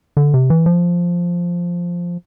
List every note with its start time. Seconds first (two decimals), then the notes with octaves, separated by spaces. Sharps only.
0.17 D3
0.34 C3
0.50 E3
0.66 F3